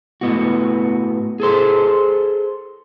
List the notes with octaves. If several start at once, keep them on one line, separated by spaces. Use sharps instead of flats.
A2 B3 F#4
G#4 A4 C5